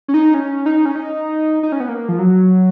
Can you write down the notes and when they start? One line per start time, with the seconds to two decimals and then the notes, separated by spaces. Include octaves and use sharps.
0.08 C#4
0.14 D#4
0.34 C#4
0.66 D#4
0.85 C#4
0.96 D#4
1.63 D#4
1.72 C#4
1.80 B3
1.89 A#3
2.09 F3
2.19 F#3